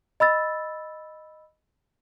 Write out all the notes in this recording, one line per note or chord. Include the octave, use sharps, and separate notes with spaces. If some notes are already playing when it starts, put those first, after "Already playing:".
D#5 B5 E6 A6